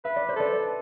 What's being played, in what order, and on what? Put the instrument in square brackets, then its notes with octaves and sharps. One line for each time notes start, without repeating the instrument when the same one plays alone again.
[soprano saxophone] B4 [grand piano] E5
[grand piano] D5
C5
[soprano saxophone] A4 [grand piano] B4 D5